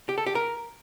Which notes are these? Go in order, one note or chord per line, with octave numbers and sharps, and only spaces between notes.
G4
A4
G4
A#4